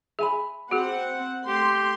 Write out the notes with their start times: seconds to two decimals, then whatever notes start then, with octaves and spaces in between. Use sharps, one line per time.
0.19 G#4 E5 G#5 B5
0.71 C4 F#4 G#4 F#5
1.48 A3 G4 C6